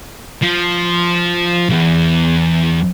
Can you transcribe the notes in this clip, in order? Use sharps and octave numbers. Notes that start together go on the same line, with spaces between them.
F3
B1 E2